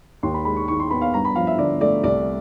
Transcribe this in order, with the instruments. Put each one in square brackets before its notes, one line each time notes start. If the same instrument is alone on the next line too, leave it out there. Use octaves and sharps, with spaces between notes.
[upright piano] D#2 C6
B5
G#3 B5
C#6
D#3 C#6
C6
B3 B5
F5
G2 A#5
B5
F3 F5
E5
D3 D5
A3 D5
C2 D5